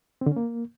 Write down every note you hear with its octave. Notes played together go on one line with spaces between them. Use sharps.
C4
D3
C#4
A#3